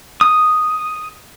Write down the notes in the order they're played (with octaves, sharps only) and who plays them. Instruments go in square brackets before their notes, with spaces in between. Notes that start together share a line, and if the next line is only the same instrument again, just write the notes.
[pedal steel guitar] D#6